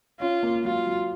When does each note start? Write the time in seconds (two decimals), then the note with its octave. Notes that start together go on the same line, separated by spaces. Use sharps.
0.20 C#4 F4
0.43 A#3
0.65 F#3 F4
0.87 F#3